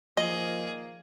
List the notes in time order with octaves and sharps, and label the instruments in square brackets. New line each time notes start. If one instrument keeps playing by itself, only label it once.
[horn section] A#2 D#3 A#3 [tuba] F3 [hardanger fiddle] G#4 [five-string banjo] D#5